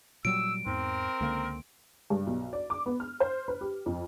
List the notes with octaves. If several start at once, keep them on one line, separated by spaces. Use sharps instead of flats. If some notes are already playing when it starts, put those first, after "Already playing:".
A#2 F#3 G3 E6 D7
E2 G#2 C4 A#4
C#2 D3 A#3
G2
B1
D5
D6
B3
F6
C5
B4
G4
F2